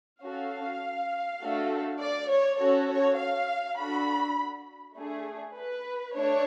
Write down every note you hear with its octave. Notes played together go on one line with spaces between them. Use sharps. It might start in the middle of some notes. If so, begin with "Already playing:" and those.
C#4 F#4 A4 F5
A3 D4 F#4 A4
D5
C#5
C#4 F#4 A4 C#5
C#5
F5
D4 F#4 A4 B5
A3 D4 G#4
B4
A3 D4 C#5